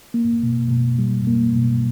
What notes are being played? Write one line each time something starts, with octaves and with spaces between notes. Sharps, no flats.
A#3
B2
B2
G3
A#3
B2